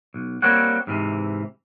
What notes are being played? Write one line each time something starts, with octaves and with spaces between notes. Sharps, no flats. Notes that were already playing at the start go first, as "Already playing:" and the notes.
B1
G3 A#3 C4 C#5 F#5
G#2 C3 E3